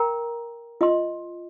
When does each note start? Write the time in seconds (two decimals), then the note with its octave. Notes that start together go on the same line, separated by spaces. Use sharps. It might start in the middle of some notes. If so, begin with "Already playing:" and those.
Already playing: A#4 G5 A#5
0.81 F4 D#5 C6